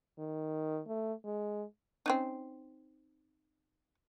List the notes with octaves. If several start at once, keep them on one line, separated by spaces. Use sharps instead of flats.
D#3
A3
G#3
C4 C#4 D#4